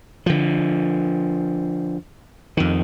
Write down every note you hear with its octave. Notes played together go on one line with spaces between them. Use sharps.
D3 F3
F2 D#3